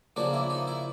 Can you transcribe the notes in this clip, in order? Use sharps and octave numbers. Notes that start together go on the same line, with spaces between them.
C#3 F3 A#3 D4 F#4
E4
D#4
E4